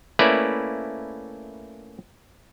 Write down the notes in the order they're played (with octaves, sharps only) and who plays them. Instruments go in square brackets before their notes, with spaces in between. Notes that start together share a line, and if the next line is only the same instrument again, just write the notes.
[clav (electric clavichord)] A3 A#3 C#4 E4 B4 D5